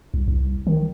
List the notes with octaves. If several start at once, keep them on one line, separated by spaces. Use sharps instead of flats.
C2
C2
D#3